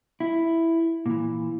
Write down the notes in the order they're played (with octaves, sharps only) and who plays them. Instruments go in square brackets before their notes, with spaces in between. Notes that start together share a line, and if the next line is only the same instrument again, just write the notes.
[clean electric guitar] E4
A#2 E3